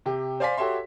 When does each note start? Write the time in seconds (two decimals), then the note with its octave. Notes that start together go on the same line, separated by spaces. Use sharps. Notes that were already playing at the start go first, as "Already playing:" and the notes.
0.06 C3 G4
0.40 C5 D5 F5 G#5 C6 B6
0.58 F#4 G4 A4 C#5 E5 C6